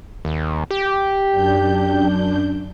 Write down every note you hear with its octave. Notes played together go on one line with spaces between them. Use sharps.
D#2
G4
F#2 D4 G6